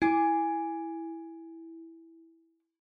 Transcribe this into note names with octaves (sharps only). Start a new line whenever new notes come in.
E4 G#5 D6